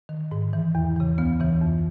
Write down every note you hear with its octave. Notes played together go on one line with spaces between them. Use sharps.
D#3
G#2
E3
E2
C#3 E3
D2 B3
C#3 E3
F2